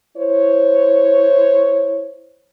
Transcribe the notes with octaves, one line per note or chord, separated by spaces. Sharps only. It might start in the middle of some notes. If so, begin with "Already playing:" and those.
E4 C5 C#5